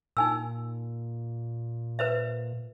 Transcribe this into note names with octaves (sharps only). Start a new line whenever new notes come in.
A#2 D#4 G#5 E6
B4 C5 E5